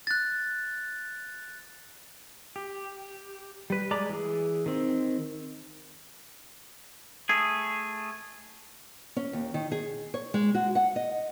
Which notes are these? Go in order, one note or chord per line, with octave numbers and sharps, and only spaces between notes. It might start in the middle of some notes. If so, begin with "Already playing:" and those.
F#6 A6
G4
G3 B4
G#3 D5 A#5 B5 D6
E3 G#4
D#3 C4
A3 G#4
C#4
D#2
D#3
G#4
C#5
G#3
F#4
F#5
D#5